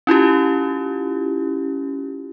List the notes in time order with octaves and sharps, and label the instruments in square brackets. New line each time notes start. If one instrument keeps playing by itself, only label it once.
[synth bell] C#4 E4 F4 G4